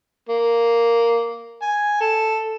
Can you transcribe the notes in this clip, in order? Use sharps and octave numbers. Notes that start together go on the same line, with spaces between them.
A#3
G#5
A4